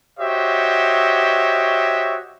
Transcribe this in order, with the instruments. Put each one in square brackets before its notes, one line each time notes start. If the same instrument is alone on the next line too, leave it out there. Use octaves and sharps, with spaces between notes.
[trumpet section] F#4 G4 C5 C#5 D#5 E5